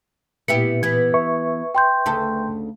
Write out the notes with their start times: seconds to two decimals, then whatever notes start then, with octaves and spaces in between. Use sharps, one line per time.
0.48 A#2 B3 E4 G4 C#7
0.83 E3 B3 G#6
1.14 B4 E5 C#6
1.75 G5 C6 G6
2.06 D2 C#3 A4